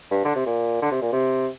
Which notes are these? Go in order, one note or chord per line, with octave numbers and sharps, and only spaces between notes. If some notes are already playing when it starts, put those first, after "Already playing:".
G2
D3
C3
A#2
D3
C3
A#2
C3